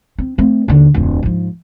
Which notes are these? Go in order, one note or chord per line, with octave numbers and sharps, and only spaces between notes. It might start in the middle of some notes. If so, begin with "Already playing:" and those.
C4
A3 C4
D#2 D3
D1 F2
G#2 F3